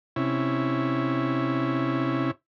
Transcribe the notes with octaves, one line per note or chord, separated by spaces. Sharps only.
C3 C#4 E4